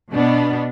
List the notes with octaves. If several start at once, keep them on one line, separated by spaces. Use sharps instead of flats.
B2 B3 D4